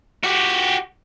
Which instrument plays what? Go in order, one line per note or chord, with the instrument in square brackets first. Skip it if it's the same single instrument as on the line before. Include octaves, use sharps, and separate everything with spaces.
[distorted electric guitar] F#4 G4